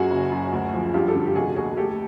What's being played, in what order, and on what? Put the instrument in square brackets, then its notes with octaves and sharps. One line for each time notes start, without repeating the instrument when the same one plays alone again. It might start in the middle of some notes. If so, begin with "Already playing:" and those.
Already playing: [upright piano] F#2 F#4 G#4
F#1
F#2
D2
F3
G2 F4 G4
G4 A4
D3
G4
F1 F#4 G#4
D#2 F#4 G#4
A3 G4 A4